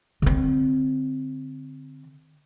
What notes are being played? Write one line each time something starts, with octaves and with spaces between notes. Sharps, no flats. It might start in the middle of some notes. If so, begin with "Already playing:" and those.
D3 C4